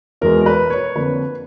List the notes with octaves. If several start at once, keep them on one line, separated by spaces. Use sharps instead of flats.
E2 B2 G#3 B3 A#4
A#4
B4
C#5
F2 D3 F3 A#3 B4